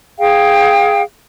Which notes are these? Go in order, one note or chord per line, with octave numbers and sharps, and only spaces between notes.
G#4 F5 G5